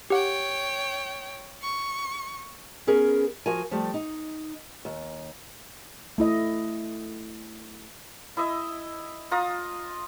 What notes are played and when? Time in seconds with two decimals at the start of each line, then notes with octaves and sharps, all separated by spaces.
0.10 G4 C#5 F#5 G5
1.62 C#6
2.87 B3 C#4 G#4 A#4
3.46 F3 F#4 A#4 F5 G#5
3.71 F3 G3 A3
3.94 D#4
4.85 D#2
6.18 A3 E4 D#5
8.37 E4 D#5 E5
9.31 F4 A#5 D#6